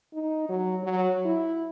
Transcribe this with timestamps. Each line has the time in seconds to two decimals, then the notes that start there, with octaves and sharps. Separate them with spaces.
0.14 D#4
0.49 F#3
0.84 F#3
1.25 E4